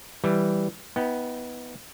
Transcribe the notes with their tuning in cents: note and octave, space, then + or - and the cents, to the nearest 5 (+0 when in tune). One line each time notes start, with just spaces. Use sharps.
E3 +0 G3 +0
B3 +0 D#4 +45 G5 +0